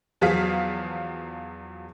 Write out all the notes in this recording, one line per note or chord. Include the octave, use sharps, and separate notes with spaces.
E2 F3 F#3 G#4 F5 B6